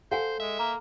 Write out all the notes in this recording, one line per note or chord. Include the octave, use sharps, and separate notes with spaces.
A4 C5 F5 F#5 G#5
G#3 E5
A#3 A#5